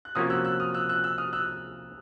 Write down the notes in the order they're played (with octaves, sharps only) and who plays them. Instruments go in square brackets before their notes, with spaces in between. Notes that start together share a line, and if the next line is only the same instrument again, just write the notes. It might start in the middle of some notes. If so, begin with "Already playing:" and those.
[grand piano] F#6
[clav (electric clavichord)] C3 F3 A#3 C#4 F#4 [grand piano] D#6 F6
[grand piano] E6 F#6
E6 F#6
D#6 F6
E6 F#6
E6 F#6
E6 F#6
D#6 F6
E6 F#6